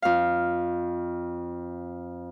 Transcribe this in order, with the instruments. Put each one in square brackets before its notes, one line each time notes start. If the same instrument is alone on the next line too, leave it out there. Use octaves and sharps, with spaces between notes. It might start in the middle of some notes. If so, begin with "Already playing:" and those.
[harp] F2 F5